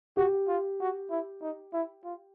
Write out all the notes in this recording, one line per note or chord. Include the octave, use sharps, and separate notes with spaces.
F#4 G4
F4
F#4
E4
D#4
E4
F4